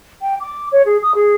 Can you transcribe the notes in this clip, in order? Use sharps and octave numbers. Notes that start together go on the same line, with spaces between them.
G5
D6
C#5
G#4
D#6
G#4